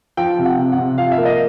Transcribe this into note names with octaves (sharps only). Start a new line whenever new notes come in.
F3 G5
C3
F#5
C3
F#5
C3
F3 F5
E5
A#3
D#5